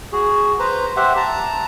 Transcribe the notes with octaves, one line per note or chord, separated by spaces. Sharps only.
F#4 G#4
B4 C5 A#5
G4 C5 E5 F#5
A5 A#5